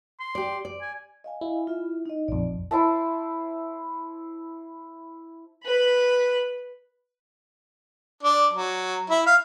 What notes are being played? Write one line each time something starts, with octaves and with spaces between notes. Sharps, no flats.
C6
G4 D5
D5
G#5
D#5 F5 G#5
E4
F4 E5
D#4 D#5
A#1 F2 D5
E4 C5 E5 A5
B4 B5
D4
F#3
E4
F5